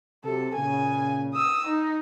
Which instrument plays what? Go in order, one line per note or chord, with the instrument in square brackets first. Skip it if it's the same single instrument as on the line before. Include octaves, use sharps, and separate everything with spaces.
[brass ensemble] C3 F#3 G4 [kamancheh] A4
[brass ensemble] A#2 C#3 [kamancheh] G#5
[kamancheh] D#6 E6
D#4